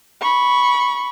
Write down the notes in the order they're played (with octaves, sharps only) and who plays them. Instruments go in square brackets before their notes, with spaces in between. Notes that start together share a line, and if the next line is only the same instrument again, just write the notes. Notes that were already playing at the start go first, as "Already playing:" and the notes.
[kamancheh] B5 C#6